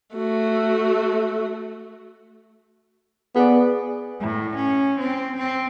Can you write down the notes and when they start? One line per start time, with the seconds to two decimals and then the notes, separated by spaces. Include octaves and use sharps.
0.15 A3 F#4
3.36 B3 G#4 D5
4.21 A2
4.56 C#4
5.00 C4
5.37 C4